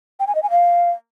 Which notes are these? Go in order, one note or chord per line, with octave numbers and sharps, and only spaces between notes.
G5
G#5
D#5
G#5
F5